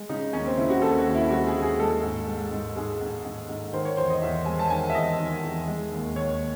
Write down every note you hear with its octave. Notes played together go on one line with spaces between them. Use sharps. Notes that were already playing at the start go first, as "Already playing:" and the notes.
Already playing: G#3
C#3 D#4
D#2 C#4
C4
C#3 E4
F#4
D#2 A4
F#4
D#2
E4
G#3 F#4
G#4
D#2
G#4
G#3 A4
G#2
G#3
G#2
G#2 G#4
G#2
G#2
G#2
D#3 C5
C#5
E2 C5
D#5
E2 E5
G#3 G#5
A5
D#3 G#5
E5
E2 D#5
D#3
E2
G#3
D#2
D#2 C#5